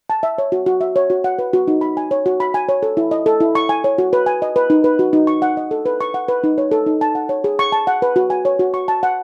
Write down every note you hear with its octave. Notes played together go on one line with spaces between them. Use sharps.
A5
E5
C#5
F#4
F#4
E5
C#5
F#4
F#5
B4
F#4
D#4
B5
G#5
C#5
F#4
B5
G#5
C#5
A4
E4
D#5
A4
E4
C#6
G#5
C#5
F#4
B4
G#5
D#5
B4
D#4
B4
F#4
D#4
C#6
F#5
D#5
A4
B4
C#6
F#5
B4
D#4
C#5
A4
D#4
A5
F#5
C#5
G#4
C#6
A5
F#5
B4
F#4
G#5
C#5
F#4
C#6
A5
F#5